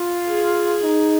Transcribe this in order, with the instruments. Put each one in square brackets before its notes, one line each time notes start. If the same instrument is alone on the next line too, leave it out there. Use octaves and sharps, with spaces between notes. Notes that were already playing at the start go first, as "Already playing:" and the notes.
Already playing: [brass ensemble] F4
[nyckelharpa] G#4
[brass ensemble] D#4